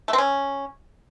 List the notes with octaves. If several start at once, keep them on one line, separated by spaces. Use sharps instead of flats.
A3
C4
C#4